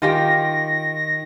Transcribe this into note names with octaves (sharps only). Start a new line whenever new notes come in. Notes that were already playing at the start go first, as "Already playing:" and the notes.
D#3 F4 G4 G5 A#6